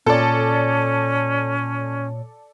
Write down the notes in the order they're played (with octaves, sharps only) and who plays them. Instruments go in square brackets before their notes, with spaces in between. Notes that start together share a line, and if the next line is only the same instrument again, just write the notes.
[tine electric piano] A#2 C#5 [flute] C#4 [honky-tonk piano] A4 D5